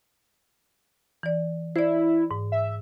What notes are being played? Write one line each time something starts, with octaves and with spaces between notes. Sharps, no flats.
E3 D5
E4 C5 D5
G#2
E5